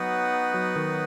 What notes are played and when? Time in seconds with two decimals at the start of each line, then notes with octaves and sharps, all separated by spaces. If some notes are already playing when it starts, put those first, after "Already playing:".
Already playing: F#3 B3 D#4 F#4 B4 F#5
0.54 F#3
0.76 D#3